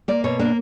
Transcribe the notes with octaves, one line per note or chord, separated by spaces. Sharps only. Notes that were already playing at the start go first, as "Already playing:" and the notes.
A#3 D5
B2 C#5
A#3 D4